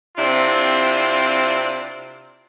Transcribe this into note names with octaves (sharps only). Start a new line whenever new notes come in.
C3 C4 D4 E4 F4